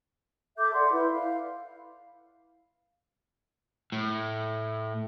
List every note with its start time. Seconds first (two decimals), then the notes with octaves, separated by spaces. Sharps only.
0.58 A4 E5 D6 G6
0.74 D5 F#5 C6
0.91 E4 B4
1.11 F5
3.92 A2